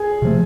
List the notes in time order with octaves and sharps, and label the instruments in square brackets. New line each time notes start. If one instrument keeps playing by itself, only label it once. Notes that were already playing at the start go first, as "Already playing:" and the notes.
Already playing: [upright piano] G#4
[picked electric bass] C3 F3 A3